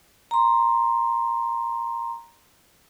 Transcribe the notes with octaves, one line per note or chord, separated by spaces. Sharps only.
A#5 C6